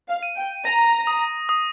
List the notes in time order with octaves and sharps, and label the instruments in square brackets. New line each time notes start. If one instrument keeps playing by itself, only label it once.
[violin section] F5
[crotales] D#7
[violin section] G5
[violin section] A#5 [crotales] A#6
[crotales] D#6
D#6